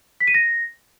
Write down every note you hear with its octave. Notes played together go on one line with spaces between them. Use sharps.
B6
D#7
A#6